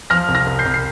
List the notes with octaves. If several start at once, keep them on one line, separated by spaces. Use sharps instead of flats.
F3 F6 A#6
C2
F6 A#6
C2
G6 C7
C2
C7